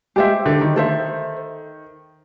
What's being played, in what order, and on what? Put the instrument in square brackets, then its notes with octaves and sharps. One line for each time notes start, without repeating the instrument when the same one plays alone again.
[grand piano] G#3 [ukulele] G4 C5 E5
[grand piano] D3
D#3
[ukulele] A4 C5 E5